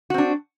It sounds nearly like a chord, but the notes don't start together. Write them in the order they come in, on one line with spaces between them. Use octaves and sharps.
F#4 C4 D4